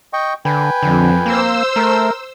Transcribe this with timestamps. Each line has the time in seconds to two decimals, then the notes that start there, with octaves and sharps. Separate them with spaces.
0.13 D#5 G5 C#6
0.45 D3 B4 G5 G#5
0.83 F2 D3
1.26 A#3 C5 E6
1.76 A3 A#4